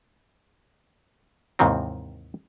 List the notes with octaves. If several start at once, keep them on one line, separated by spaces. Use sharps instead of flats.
D#2 G#2 C3 D#3 E3 C4